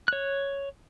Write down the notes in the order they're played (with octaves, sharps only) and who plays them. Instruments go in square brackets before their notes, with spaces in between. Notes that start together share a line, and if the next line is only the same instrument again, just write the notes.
[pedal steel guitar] C#5 F#6